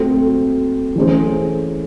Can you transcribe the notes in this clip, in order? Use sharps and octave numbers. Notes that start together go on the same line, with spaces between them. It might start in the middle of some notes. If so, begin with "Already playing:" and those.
Already playing: A3 C4 F#4 A4 C5
E3 A3 C#4 G#4 C5